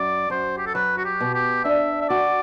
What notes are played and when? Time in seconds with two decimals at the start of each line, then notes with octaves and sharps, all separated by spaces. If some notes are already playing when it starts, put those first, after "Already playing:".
Already playing: F#2 D5
0.30 F#2 C5
0.58 G4
0.66 A4
0.75 F#3 B4
0.97 F#4
1.05 G4
1.20 B2
1.34 G4
1.64 D4 E5
2.02 E5
2.09 F#4 D5